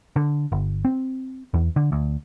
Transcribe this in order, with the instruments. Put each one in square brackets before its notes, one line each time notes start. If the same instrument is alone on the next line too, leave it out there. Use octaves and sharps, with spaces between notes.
[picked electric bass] D3
G1
C4
E2
D3
D2